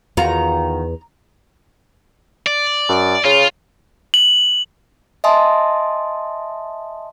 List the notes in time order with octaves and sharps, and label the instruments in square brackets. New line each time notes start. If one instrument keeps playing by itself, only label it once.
[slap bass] E2 [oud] D#3 F4 F#4 [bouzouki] A#5
[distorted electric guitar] D5
[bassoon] F#2
[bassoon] C#3 [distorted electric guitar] F4
[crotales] F#7
[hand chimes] D#5 E5 G#5 A5 C6 D#6